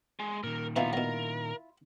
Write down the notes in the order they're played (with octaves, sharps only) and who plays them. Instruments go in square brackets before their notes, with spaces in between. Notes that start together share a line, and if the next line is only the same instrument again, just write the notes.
[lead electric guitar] G#3
[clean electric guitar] A#2 D#3 [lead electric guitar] A#4
[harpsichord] B2 E3 [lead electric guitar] B3 A#5 [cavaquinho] E4 F4
[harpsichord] B2 F#3 [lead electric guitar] A#4